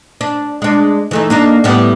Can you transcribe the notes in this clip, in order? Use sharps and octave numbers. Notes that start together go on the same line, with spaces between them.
D4
G#3 D4
E3 A3 D#4
A#3 D4 D#4
A2 G3 B3